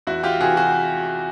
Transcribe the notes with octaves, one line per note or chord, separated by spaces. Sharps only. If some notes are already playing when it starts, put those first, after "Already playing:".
E2 E4 F#4
F4 G4
C3 E3 F#4 G#4
F#4 G#4